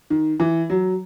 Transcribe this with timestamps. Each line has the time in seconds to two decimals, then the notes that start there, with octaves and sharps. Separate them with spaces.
0.10 D#3
0.40 E3
0.70 F#3